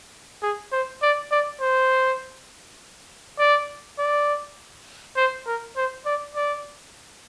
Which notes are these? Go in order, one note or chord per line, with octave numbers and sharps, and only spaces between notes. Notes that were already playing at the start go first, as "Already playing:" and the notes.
G#4
C5
D5
D5
C5
D5
D5
C5
A#4
C5
D5
D5